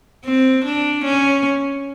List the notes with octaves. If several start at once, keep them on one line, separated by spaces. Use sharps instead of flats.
C4
D4
C#4